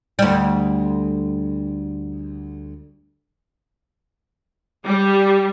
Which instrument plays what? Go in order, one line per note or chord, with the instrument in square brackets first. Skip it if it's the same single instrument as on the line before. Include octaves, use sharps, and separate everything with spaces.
[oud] D2 G3
[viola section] G3